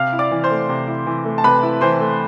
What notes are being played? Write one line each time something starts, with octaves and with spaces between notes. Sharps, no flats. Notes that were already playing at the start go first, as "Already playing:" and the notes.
Already playing: C3 F5 F6
E4
D5 D6
E3
C5 C6
A3
C3
E4
E3
A3
A5
C3 B4 B5
E4
E3 C5 C6
A3